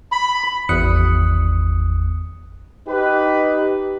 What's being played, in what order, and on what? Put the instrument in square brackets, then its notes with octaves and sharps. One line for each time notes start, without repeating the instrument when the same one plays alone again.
[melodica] B5
[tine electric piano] G#1 E2 D#6 F#6 C#7
[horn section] D#4 G4 B4